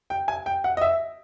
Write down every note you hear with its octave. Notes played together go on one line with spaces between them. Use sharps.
G5
G#5
G5
F#5
D#5
E5